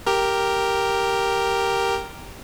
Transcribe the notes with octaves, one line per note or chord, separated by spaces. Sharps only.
G4 A#4